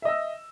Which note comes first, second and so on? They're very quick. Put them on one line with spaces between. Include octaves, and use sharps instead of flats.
E5 D#5 E6